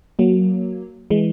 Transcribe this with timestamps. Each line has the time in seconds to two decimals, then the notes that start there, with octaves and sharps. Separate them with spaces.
0.19 F#3 A#3
1.10 E3 G#3